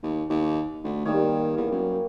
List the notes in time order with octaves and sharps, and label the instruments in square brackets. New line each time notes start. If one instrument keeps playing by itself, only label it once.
[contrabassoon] D#2
D#2
D2
[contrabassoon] D#3 [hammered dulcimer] G3 A#3 C#5
[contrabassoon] E2
F#2